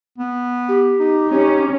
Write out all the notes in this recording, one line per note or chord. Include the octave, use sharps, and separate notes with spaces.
B3
G4
D#4
C#4 G4